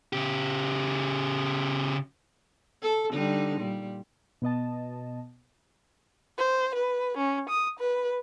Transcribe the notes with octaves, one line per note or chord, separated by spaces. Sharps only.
C#3 G4
A4
D3 G3 D#4
A#2 G3
B2 B3 D#5 A5
C5
B4
C#4
D#6
B4